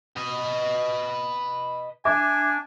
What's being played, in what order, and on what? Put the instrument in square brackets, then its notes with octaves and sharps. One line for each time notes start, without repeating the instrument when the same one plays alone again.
[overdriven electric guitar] B4 D#5
[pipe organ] D4 [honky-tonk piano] E5 D6 [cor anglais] G#5